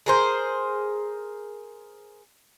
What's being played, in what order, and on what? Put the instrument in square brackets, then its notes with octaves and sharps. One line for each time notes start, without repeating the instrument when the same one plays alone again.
[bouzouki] G#4 A#4 C5